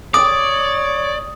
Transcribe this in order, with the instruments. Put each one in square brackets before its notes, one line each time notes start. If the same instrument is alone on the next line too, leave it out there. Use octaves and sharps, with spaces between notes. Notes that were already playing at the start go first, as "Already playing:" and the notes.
[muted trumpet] C#5 [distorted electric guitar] D5 [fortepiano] D6 [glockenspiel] D#6